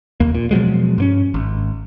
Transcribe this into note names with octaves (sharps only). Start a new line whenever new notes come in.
F1 D#2 A#3
A#2
B2 F3 F#3 G#3
G2 A#3 C#4
G#1